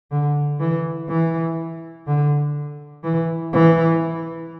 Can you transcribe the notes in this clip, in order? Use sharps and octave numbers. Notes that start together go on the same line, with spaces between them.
D3
E3
E3
D3
E3
E3